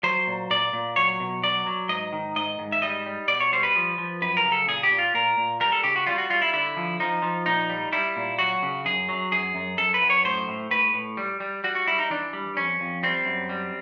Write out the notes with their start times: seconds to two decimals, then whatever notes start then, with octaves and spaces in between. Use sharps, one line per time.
0.03 F#3 C5
0.27 A#2
0.51 A#2 D5
0.73 A#2
0.96 F#3 C#5
1.20 B2
1.43 F#3 D5
1.66 F#3
1.89 G#2 D#5
2.13 D#3
2.36 G#2 D#5
2.59 G#2
2.72 E5
2.82 G3 D#5
3.06 G3
3.28 B2 D5
3.40 C#5
3.52 G3 C5
3.63 B4
3.76 F3
3.98 F3
4.22 F#2 B4
4.37 A#4
4.44 C#3
4.52 A4
4.68 A#2 G#4
4.83 G4
4.91 A#2
4.98 F4
5.14 A#2 A#4
5.37 A#2
5.60 G3 A#4
5.72 A4
5.84 C#3 G4
5.96 F#4
6.07 G3 F4
6.18 F#4
6.30 G3 F4
6.42 E4
6.53 D3 E4
6.77 F3
7.00 F3 D#4
7.22 F3
7.46 A#2 D#4
7.69 G3
7.92 G3 E4
8.16 A#2
8.39 F#3 F#4
8.63 C#3
8.85 F#2 G#4
9.09 F#3
9.32 F#2 G#4
9.55 F#2
9.78 F#2 A4
9.94 B4
10.01 F#2
10.10 C#5
10.25 A2 C5
10.48 A2
10.71 A2 B4
10.94 A2
11.17 G3
11.40 G3
11.64 G3 F#4
11.75 F#4
11.86 G3 E4
11.98 D#4
12.10 E3 D4
12.33 G3
12.57 F2 C#4
12.80 F2
13.03 G3 C4
13.26 F#2
13.49 G3